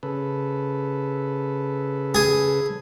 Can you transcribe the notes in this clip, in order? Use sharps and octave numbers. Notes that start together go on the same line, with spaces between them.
C#3 A4 B4
G#4